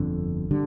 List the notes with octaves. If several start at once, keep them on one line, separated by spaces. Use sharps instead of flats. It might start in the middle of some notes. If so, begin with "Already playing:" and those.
Already playing: G1 F2 D3
D3 G3